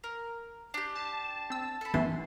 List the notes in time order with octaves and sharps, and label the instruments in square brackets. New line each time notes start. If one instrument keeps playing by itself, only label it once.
[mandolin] A#4
D4 G4
[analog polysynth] A5
[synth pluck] C4 E6
[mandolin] A4 B5
[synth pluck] E3 A3 B3 [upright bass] C#4 [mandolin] C6